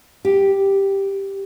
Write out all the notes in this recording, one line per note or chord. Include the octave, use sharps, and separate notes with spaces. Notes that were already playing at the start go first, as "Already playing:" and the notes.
G4